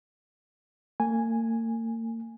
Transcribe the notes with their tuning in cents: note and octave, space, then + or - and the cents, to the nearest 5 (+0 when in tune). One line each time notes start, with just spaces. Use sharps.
A#3 -45 G#5 -5